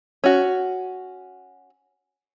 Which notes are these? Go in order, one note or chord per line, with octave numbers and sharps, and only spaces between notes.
C#4 F#4